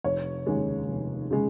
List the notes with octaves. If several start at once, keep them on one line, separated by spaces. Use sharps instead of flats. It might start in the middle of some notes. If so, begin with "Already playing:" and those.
F1 C#5
D#2 C#3 G#3
F1
C#3 G#3